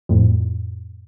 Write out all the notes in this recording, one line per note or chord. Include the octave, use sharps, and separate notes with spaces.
F2 A2